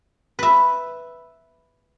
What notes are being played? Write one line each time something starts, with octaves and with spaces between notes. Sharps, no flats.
B4 E5